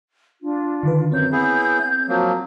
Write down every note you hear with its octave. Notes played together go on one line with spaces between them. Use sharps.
D4 F4
D3 D#3 B4
F#2 C4 C#5 G6
B3 E4 G#4
F3 F#3 A#3